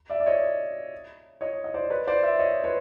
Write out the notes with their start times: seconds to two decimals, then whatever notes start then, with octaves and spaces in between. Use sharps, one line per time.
0.10 D5 E5
0.20 D5
0.26 C#5 D#5
1.41 C#5 D#5
1.64 D#5
1.74 C5 D5
1.90 B4 C#5
2.07 C5 D5
2.23 D5 E5
2.39 C#5 D#5
2.64 B4 C#5